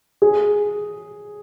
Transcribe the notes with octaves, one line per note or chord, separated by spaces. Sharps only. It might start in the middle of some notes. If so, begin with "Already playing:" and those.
G#4